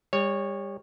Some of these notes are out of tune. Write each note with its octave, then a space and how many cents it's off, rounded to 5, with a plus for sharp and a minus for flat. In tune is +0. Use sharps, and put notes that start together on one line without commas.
G3 +35 C#5 -5